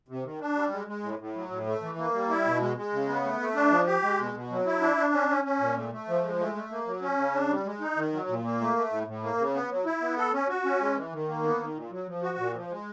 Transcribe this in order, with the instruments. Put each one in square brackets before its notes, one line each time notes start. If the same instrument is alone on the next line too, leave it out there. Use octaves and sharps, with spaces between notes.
[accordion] C3
D#3
D4
G3
G#3
G#3
A2
A2
F#3
A2
A3
E3
A#3
G3
E4
B2
G#3
G#3
C#3
B3
A3
A3
D4
F3
G4
G#3
B2
B2
F#3
E4
D4
D4
C#4
C#4
C#4
A#2
A3
A3
F3
G#3
A3
A3
A#3
F#3
C#4
C#3
D4
G3
G#3
D#4
D#3
F#3
A#2
A#3
A3
A3
A2
A2
A#3
C#3
B3
F#3
E4
B3
A4
C#4
F#4
C#4
G#3
E3
D#3
A#3
B3
D#3
A#2
F#3
F3
F#4
A#2
F3
G#3